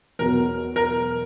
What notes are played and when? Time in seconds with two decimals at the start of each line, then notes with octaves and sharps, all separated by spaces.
0.19 E2 B2 F#3 B3 A#4
0.76 A#4